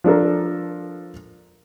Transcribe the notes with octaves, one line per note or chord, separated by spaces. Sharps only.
F3 D4 A4 A#4